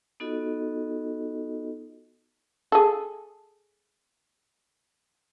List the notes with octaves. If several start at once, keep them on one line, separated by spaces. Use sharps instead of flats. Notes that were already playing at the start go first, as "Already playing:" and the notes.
B3 D#4 F4 F#4 A4 D#5
G#4 A4